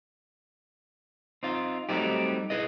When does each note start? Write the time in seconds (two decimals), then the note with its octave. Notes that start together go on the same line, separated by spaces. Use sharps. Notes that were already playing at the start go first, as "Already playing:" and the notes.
1.43 C4 D#4 F4
1.89 F#3 G3 A3 C4 D#4 G4
2.50 E4 G#4 B4 D#5